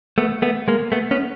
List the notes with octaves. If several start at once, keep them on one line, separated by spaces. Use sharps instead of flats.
A3 B3
A3 B3
G#3 A#3
A3 B3
B3 C#4